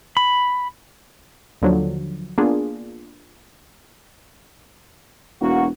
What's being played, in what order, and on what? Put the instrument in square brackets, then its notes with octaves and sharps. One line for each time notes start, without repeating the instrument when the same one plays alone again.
[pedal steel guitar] B5
[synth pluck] D#2 D3 F3 F#3
A#3 B3 D4 F4 G#4
[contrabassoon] E1 [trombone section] A#3 F#4